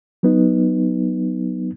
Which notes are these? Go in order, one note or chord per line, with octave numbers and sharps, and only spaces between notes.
F#3 B3 D#4